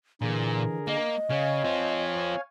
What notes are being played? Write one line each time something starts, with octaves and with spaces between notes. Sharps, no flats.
A#2 D3 E3 G#4 A#4
A#3 D#5
C#3 C#5 F5 G#5
C4 F4